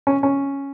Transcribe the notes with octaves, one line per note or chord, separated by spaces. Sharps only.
C#4
C#4